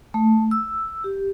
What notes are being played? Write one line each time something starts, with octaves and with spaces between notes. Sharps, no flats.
A3
E6
G4